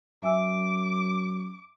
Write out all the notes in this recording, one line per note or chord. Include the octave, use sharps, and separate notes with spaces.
F#2 E5 G#5 D6 E6